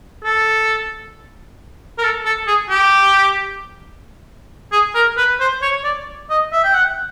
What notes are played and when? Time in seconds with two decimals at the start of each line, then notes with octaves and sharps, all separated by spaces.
0.24 A4
1.98 A#4
2.03 A4
2.25 A4
2.47 G#4
2.69 G4
4.72 G#4
4.95 A#4
5.17 B4
5.40 C5
5.62 C#5
5.84 D5
6.30 D#5
6.52 E5
6.64 G5
6.74 F#5